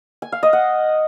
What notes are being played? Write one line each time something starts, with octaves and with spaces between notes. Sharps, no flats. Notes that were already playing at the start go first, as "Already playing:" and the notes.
G#5
F5
D#5
F#5